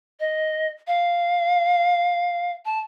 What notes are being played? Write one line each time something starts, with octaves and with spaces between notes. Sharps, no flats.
D#5
F5
A5